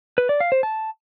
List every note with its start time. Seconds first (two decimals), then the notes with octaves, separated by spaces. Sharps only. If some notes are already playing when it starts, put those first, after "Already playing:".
0.18 B4
0.29 D5
0.40 F5
0.52 C5
0.63 A5